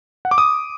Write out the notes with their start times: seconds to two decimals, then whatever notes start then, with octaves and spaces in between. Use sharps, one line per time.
0.25 F#5
0.31 D6
0.38 D#6